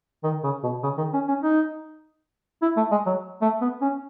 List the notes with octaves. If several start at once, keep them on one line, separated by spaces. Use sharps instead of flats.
D#3
C#3
B2
C#3
D#3
C#4
C#4
D#4
E4
A3
G#3
F#3
A3
B3
C#4